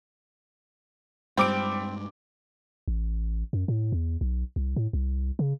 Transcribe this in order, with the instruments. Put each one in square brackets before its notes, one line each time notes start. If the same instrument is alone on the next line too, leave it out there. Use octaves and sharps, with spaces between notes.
[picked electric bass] G2 G#3 [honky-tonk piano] G3 D6 D7 [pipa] C4
[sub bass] A1
F#2
A2
E2
B1
C2
A2
C2
C#3